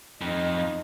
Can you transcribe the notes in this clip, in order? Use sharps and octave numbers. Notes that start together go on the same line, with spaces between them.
F2 D#4